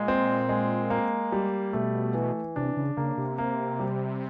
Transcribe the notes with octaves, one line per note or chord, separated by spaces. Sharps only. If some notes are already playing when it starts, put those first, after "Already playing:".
Already playing: A#2 G#3
C4
G#3
A#3
G3
B2 A3
E3
C3 D4
C#3
C#3 A#3
C3
A#3
G3